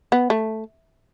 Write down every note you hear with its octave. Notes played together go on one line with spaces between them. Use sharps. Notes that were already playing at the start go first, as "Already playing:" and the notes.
B3
A3